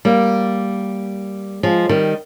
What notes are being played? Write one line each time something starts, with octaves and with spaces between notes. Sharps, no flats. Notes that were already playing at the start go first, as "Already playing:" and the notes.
G3 A#3
F3 G#3
D#3 G3